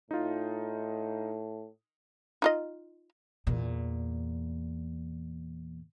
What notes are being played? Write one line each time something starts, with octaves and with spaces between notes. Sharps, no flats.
A2 D#4 F4
D#4 F4 D#5
E2 A#2